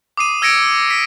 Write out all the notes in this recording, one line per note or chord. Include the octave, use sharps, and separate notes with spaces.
D6 D#6 C7 D#7
E6 G#6 A#6 C#7 D7
E6
B6